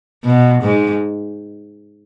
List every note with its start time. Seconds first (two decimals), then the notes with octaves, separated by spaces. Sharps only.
0.24 B2
0.63 G#2